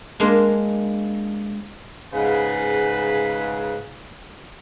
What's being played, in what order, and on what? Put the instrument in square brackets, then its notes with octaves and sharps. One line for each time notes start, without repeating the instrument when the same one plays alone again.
[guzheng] G#3 A#3 D4
[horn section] G#2 C#3 B4